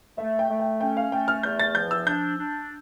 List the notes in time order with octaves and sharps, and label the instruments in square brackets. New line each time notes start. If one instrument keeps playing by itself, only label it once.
[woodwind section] A3 [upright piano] E5
[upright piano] G5
[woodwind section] A3
[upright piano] G5
[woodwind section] C#4 [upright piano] G5
[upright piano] F5
[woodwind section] A3 [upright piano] G5
[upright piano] F6
[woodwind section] E2 [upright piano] G6
[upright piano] A6
[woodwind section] F3 [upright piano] G6
[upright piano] E6
[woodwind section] D4 [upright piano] G6
[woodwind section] D4